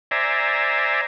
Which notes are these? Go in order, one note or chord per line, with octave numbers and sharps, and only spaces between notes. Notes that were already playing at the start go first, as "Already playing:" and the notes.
C5 D5 E5 G#5 A#5